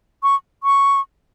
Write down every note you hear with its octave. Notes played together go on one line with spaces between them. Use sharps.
C#6
C#6